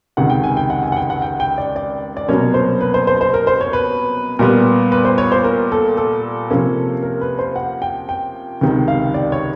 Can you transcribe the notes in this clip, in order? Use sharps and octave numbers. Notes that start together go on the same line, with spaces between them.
C#2 C3 D#3 F#5
G5
G#5
G5
F#5
G#5
F#5
G5
F#5
G5
G5
D5
D5
D5
C2 B2 F#3 A#3 C#4 C#5
C5
B4
C5
C5
C5
A#4
C5
C#5
B4
A#2 G3 B3 A#4
B4
C5
C#5
C5
A#4
A4
A4
C3 F3 A#3 C#4
A#4
B4
C5
F#5
G5
G5
C#2 C3 D#3
F5
D5
C#5